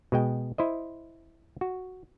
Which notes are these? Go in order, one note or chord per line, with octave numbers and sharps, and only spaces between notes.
B2 G#3 G5
E4 C5 D#5
F#4